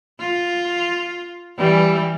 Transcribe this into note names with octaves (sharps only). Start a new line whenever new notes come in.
F4
E3 G3